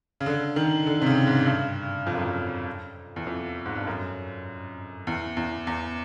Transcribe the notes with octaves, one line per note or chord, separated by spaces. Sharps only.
C#3
D3
D#3
D3
C3
C#3
G#2
G2
F2
F#2
F2
E2
F2
G#2
G2
F#2
E2
E2
E2